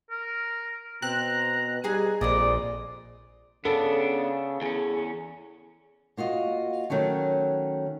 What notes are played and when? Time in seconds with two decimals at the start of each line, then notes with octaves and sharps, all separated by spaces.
0.11 A#4
1.02 B2 C4 A#5 F#6
1.84 G3 D#4 G#4 G#5
2.21 A#1 F2 A#2 F4 D5 D#5
3.65 C#3 B3 D4 A4
4.62 E2 C#4 G#4
6.17 A#3 F4 F#4 D#5
6.90 D#3 F#3 A3 C#4